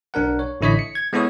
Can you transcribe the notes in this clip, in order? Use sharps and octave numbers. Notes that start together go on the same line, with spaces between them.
B1 D4 A#4 F#5
C#5
A1 D3 E4 C#5 D#5 B6
C#7
G#6
G#3 B3 E4 A4 C#5 D#6